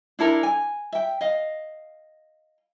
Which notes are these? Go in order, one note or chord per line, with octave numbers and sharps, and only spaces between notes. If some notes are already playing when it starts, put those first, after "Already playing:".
D4 E4 A4 A#4
G#5
E5 G5
D#5 F5